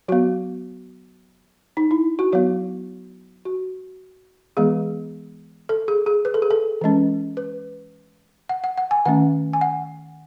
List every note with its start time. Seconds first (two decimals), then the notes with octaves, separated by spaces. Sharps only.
0.08 F#3 B3 F#4
1.77 D#4
1.91 E4
2.19 F#4
2.33 F#3 B3 F#4
3.45 F#4
4.57 E3 G#3 B3 G#4
5.69 A4
5.88 G#4
6.06 G#4
6.25 B4
6.34 A4
6.42 G#4
6.51 A4
6.81 E3 G#3 C#4
7.37 B4
8.49 F#5
8.64 F#5
8.78 F#5
8.91 G#5
9.06 D#3 A3 C#4 F#5
9.53 G#5
9.61 F#5